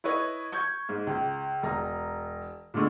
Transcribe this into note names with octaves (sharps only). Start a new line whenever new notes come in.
E4 B4 C#5 D#5
C#6 G6 G#6
G#2
C#2
E1 A#5
A#2 D3 G#3 A3